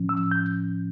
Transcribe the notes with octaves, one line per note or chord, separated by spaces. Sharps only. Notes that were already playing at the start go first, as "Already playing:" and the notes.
Already playing: A2 F3 C#4
E6
G6